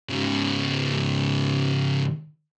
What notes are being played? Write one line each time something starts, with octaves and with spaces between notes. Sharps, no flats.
G#2 C#3